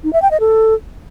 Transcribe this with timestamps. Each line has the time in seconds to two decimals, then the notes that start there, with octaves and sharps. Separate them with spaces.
0.04 D#4
0.13 E5
0.22 G5
0.31 D#5
0.40 A4